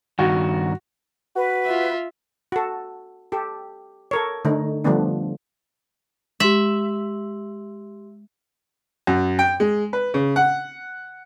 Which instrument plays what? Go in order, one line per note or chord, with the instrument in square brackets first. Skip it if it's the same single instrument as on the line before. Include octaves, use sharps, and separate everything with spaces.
[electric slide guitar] G2 D#3 [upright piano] F#4
[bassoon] F#4 [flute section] B4
[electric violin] F4 E5
[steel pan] F#4 A4
G4 A4
A4 A#4 C#5
D3 A3 D#4
D3 F3 G3 A3 B3 D4
[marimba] G#3 [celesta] G4 C6 F#7 [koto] E5
[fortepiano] F#2
G5
G#3
B4
C#3
F#5